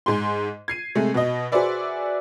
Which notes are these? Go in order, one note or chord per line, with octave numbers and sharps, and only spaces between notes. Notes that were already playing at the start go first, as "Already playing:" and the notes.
G#2 G#5 C6
G#6 C7 D#7
C3 G#3 A3
B2 D#5
F#4 G#4 B4 C5 D5 E5